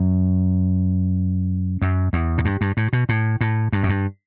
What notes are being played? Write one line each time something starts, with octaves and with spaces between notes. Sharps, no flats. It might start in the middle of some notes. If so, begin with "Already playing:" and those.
Already playing: F#2
F#2
E2
A2
G2
G2
A2
B2
A2
A2
G2
F#2
G2